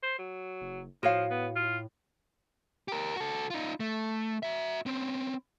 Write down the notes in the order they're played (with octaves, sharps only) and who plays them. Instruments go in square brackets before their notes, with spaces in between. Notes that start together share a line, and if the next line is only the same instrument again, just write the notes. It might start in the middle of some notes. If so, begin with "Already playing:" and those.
[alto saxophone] C5
F#3
[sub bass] F#1
[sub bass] A2 [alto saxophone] F3 [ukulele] F#4 C#5 F5
[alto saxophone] B3
F4
[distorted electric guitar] G4 A#4
F#4 A4
D#4 F4
A3
F#4 E5
C4 C#4